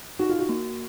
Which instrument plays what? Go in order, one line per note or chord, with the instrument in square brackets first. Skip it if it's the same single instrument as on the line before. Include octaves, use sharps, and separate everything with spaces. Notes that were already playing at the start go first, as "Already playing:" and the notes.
[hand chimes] D#4 [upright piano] F#4
[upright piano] F4
F#4
[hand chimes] A#3